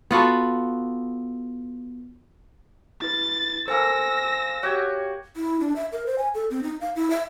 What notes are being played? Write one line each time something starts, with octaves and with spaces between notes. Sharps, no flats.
B3 F4 F#4 A4
E4 B4 A6
A#3 A4 C5 G#5 E6 A#6
F#4 G4 C#5 G#5
E4
D4
E5
A#4
C5
G#5
A4
C4
D#4
F5
E4
E5